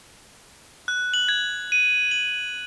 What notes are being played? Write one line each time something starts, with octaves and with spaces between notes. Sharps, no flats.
F#6
F#7
G#6
D#7
F#7